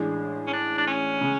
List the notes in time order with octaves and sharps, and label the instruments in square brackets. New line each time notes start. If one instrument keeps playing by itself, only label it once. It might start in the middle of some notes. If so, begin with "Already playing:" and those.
Already playing: [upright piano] A1 A2 G#3 D4
[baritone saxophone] C#4
D4
D4
C#4
[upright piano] C#3 G#3